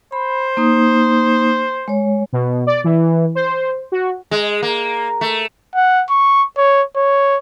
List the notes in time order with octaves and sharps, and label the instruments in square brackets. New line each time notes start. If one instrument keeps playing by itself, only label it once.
[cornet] C5 [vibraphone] B5
[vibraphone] A#3 D#4 D#6
G#3 C#5
[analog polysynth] B2
D5
E3
C5
F#4
[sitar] G#3
A#3
A3
[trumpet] F#5
C#6
C#5
C#5